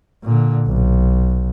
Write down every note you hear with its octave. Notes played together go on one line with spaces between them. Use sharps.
A#2 D3
B1